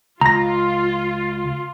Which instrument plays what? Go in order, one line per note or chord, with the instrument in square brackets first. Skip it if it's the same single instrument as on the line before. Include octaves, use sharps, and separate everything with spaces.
[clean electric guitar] C#2 [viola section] F4 [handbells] A#5 A#6